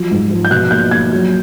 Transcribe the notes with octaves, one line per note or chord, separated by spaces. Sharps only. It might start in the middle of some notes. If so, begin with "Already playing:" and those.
Already playing: F3 F#3
G#2
F3
G6
B2 F#6
A#3 G6
A#3 G#6
F#3